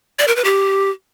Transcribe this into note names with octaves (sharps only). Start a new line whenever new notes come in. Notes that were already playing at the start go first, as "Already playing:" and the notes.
D5
A#4
B4
G4